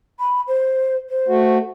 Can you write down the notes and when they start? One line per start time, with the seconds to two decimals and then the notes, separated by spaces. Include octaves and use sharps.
0.19 B5
0.48 C5
1.10 C5
1.28 A3 F#4